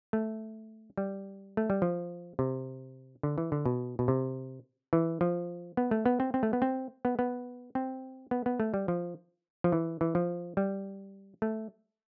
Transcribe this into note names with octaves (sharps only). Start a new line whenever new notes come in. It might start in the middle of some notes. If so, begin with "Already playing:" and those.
A3
G3
A3
G3
F3
C3
D3
E3
D3
B2
B2
C3
E3
F3
B3
A3
B3
C4
C4
A3
B3
C4
B3
B3
C4
B3
B3
A3
G3
F3
F3
E3
E3
F3
G3
A3